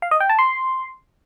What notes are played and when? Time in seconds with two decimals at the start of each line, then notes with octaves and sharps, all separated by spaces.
0.02 F5
0.11 D#5
0.20 G5
0.30 A5
0.39 C6